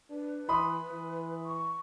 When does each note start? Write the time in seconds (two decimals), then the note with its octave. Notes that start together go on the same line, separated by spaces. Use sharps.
0.10 D4 B4
0.49 E3 B5 C6 D#6
0.91 E3
1.44 C#6